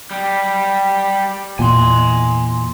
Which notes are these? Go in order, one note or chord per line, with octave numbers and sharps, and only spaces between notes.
G3
E2 A#2 G#5 C6